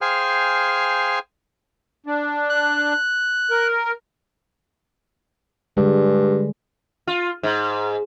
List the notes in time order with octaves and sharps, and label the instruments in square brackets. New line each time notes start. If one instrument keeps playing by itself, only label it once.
[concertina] G#4 C5 F5 G5 G#5 F6
[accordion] D4
[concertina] F#6
[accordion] A#4
[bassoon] G2 [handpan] D3 G3 G#3
[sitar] F4
G#2